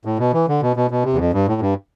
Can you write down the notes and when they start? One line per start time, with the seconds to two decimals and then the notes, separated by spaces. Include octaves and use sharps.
0.05 A2
0.19 B2
0.33 E3
0.48 D3
0.62 B2
0.76 B2
0.91 B2
1.04 C3
1.13 E2
1.19 F2
1.34 G2
1.48 A2
1.61 G2